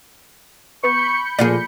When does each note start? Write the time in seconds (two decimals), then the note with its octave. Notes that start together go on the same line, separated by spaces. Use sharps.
0.84 B3 B4 B5 C#6 G6 C#7
1.39 A#2 F3 A#3 F4 G#4 D5